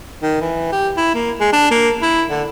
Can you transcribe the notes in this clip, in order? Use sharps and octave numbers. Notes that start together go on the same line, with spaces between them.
D#3
E3
G4
E4
A#3
G#3
D4
A#3
E4
D3